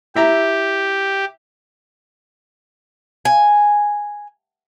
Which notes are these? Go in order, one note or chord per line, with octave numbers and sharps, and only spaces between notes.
E4 G4 E5 A#5
G#5